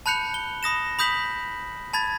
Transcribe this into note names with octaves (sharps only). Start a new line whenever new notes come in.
A5 B5 F#6 G6 C#7 F7
G7
B5 D#6 A#6 E7
B5 D#6 G6 B6 F#7
A5 B5 G#6 A6